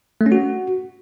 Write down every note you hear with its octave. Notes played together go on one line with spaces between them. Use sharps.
A3
C#4
F#4